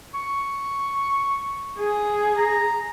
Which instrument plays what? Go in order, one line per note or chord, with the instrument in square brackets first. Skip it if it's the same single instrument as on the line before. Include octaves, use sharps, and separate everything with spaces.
[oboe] C#6
[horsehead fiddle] G#4
[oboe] A#5